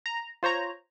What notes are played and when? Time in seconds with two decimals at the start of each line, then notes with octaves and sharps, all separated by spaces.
0.06 A#5
0.43 F4 C5 C#5 A#5